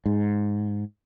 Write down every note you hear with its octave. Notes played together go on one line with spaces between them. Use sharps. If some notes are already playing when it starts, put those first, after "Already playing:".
G#2